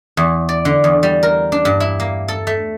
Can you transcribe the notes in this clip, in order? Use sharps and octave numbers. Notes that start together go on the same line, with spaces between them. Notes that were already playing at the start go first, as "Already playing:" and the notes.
E2
D5
D3
E2
G3
A#4
D4
G2
E4
A#3
A4
A3